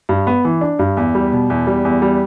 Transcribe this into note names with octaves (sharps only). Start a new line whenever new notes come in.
G2
B3
E3
D4
G2
E2
G3
B2
E2
G3
E2
G3